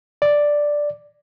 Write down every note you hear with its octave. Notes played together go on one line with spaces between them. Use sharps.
D5